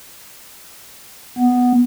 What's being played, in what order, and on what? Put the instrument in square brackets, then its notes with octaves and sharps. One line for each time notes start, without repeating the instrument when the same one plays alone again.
[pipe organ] B3